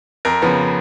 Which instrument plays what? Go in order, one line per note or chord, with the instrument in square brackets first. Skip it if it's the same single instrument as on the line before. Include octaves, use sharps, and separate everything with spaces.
[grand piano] F2 A#4
C#3 F3 B3